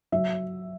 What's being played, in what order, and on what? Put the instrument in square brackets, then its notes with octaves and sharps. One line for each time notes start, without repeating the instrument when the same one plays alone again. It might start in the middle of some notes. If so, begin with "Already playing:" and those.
[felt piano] F#3 E5